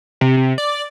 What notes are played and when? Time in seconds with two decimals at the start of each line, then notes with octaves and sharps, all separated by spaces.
0.21 C3
0.37 C3
0.58 D5